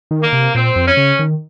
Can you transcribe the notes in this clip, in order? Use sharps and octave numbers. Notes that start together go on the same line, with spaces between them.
D#3
A#3
C3
A#2 C4
F2
C#4
C#3
D#3